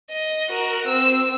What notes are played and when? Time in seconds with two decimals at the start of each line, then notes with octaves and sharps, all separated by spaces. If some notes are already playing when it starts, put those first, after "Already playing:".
0.10 D#5
0.50 F#4 A#4
0.87 C4 E6